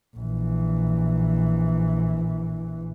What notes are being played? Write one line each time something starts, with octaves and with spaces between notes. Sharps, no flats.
A#1 E3